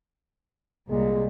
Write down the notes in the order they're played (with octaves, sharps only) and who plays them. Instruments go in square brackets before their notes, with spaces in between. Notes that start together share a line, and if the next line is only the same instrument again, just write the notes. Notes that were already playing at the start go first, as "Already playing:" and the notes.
[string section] C2 A#2 [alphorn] G#3